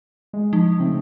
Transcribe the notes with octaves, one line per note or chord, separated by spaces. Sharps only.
G#3
F3 D#4
C#3 A3 C4